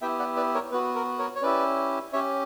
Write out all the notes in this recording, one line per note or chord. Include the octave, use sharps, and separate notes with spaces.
B3 E4 G4 E5 G5
D5 F#5
B4 D5
A#4 C#5
B3 F#4 B4
A#4
A#4 C#5
C#5
C#4 E4 G4 B4 D5
C#4 G4 C#5 E5